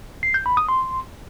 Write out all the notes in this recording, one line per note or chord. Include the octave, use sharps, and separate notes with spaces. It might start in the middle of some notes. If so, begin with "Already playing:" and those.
C7
G6
B5
D#6
C6